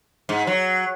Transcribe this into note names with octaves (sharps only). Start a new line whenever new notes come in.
G#2
F#3